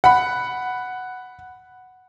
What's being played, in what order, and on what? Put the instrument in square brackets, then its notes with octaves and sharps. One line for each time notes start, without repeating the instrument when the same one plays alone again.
[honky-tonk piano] F#5 B5